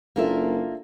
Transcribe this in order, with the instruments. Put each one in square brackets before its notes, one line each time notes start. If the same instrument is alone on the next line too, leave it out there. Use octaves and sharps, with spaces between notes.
[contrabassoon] F#1 [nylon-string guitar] A#3 A#4 E5 [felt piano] D4 F4 A4